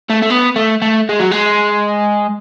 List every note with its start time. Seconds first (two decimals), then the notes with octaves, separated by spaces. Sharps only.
0.10 A3
0.22 A3
0.30 B3
0.56 A3
0.82 A3
1.09 G#3
1.20 F#3
1.31 G#3